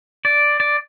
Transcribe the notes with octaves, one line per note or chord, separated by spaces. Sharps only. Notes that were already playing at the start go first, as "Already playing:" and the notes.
D5
D5